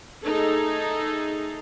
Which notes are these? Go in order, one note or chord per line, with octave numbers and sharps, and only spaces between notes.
A3 D#4 G#4 A4